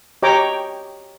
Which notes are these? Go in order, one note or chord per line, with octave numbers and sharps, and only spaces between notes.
G4 C#5 D#5 G5 A#5 D6